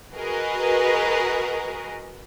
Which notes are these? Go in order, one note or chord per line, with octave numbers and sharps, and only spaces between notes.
F#4 G#4 A#4 B4 D#5